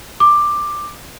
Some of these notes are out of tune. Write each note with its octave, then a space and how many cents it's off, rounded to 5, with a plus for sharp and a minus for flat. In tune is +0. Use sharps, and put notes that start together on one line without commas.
D6 +10